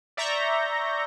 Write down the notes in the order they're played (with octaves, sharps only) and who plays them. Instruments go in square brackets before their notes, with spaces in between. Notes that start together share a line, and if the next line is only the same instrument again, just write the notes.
[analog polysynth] D5 E5 A#5 C#6 G6 A#6